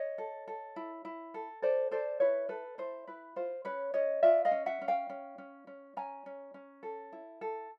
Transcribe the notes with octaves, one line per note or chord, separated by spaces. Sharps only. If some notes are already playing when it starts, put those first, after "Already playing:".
Already playing: C#5 D#5
A4
A4
E4
E4
A4
A4 C5 D5
A4 C5 D5
E4 B4 C#5
A4 B4
E4 C5
E4 B4
F4 C5
C#4 B4 C#5
C#4 C#5 D#5
F4 D5 E5
D#5 F5
C#4
E5 F#5
C#4
F5 G5
C#4
C#4
C#4
C#4 G#5 A#5
C#4
C#4
A4
E4
A4